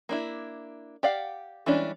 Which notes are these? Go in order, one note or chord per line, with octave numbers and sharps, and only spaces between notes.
A#3 D4 E4
G4 D5 F5 F#5
E3 G3 G#3 C#4 D4